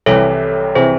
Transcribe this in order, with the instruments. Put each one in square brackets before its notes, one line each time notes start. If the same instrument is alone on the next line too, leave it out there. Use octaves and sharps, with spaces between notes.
[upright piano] C2 C3 E3 [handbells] A4 C#5
[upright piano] C3 E3 [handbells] G#4 C5